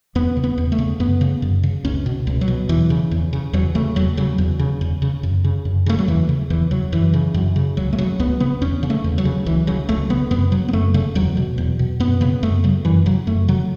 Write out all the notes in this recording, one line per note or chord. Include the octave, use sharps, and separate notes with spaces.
E2 B3
C#3
B3
E2
A3
C#3
F#2 B3
C#3
F#2
C#3
C#2 C#4
B2
C#2
F#3
B2
E2 E3
C#3
E2
C#3
E2 F#3
C#3 A3
E2 F#3
C#3 F#3
E2
C#3
E2
C#3
F#2
C#3
F#2
C#3 A3
F#3
E2 E3
C#3
E2 E3
C#3 F#3
F#2 E3
C#3
F#2
C#3
C#2 F#3
A3
C#3 F#3
C#2 B3
C#3 B3
E2 C#4
C#3
A3
E2
F#3
C#3
C#2 E3
C#3 F#3
C#2 A3
C#3 B3
F#2 B3
C#3 F#3
B3
F#2 A3
C#3 A3
E2 F#3
B2
E2
B2
F#2 B3
C#3 B3
F#2 A3
C#3 F#3
F#2 E3
C#3 F#3
F#2 A3
C#3 F#3